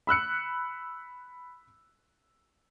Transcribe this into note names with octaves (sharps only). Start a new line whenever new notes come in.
B5 E6 F#6 C#7